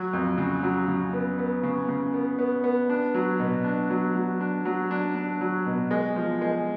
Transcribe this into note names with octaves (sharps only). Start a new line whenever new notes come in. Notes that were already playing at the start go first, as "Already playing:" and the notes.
Already playing: F#3
F2
C#3
F#3
C#3
B3
B3
C#3
C#3
B3
B3
B3
D4
F#3
B2
D4
F#3
F#3
D4
F#3
D4
D4
F#3
B2
G#3
F3
G#3